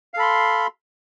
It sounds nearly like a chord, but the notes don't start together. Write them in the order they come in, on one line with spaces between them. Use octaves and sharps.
F5 A4 B5 C6